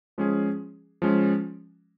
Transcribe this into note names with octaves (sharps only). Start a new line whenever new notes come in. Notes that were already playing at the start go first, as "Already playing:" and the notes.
F3 G#3 C#4 G#4
F3 G#3 C#4